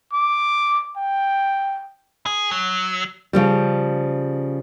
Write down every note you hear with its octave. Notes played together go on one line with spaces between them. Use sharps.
D6
G5
G#4
F#3
C#3 F3 G3